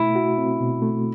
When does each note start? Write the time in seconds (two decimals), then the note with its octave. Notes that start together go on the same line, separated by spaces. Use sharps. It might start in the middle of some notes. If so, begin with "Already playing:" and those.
Already playing: B2 A3 E4
0.16 F#4
0.38 C4
0.60 B2
0.82 A3